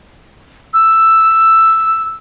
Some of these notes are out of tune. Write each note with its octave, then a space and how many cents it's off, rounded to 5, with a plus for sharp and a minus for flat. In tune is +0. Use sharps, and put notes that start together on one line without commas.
E6 +5